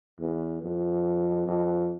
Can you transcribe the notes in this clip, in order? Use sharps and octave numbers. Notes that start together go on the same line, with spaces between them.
E2
F2
F2